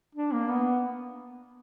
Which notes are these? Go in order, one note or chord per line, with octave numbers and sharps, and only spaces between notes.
D4
A#3
B3